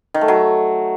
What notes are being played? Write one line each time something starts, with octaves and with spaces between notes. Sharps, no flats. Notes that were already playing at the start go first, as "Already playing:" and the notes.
D#3
A3
F#3